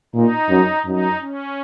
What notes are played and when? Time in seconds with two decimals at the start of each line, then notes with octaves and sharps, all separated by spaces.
0.15 A#2 D#4
0.50 F#2
0.85 F#2 D#4
1.21 C#4